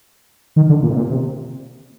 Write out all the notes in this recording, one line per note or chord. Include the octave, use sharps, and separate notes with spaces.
D#3
D3
A#2
C3
A#2
C3